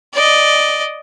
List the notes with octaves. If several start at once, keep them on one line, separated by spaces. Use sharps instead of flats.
D5 D#5